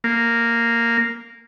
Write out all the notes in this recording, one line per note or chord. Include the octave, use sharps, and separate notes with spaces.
A#3